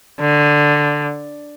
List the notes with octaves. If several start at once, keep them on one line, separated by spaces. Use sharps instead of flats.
D3